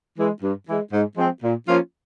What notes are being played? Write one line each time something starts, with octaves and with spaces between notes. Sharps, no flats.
E3 G#3
G2
E3 G#3
G#2
F3 G#3 C4
A#2
F3 A#3 C#4 F4